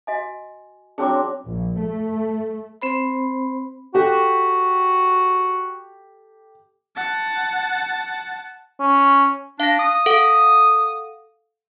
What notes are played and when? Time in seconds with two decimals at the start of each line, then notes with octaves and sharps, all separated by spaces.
0.07 F#4 D#5 G#5
0.98 F#3 C4 D4 G#4 D6
1.46 A#1
1.80 A3
2.82 C4 C5 B5
3.95 F#4 G4 A4
6.96 F#5 A5
8.80 C#4
9.60 D4 F5 A#6
9.79 D#6
10.06 A4 F5 F#5